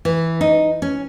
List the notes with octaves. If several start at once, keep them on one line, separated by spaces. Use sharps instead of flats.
E3
D#4
C#4